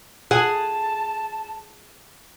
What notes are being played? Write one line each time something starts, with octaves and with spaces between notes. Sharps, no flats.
G#4 F#5 A5